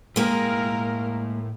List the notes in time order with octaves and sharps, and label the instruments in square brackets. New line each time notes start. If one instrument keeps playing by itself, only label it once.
[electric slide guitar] A2 E4 G5 [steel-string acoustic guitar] G#3 A#3 [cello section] A#4